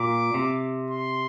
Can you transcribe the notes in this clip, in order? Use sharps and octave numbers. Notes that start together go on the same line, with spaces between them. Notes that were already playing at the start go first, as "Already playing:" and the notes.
Already playing: A#2 D6
C3
C6